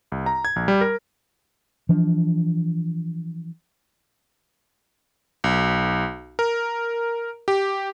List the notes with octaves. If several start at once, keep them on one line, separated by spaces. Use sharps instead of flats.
C2
A#5
G#6
A#1
G3
A#4
E3 F3 D4
B1
A#4
G4